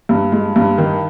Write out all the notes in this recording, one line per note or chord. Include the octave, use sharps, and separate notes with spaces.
G2
G#3
G2
D#3